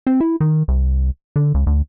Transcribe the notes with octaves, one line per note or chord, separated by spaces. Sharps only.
C4
E4
D#3
C2
D3
C#2
D2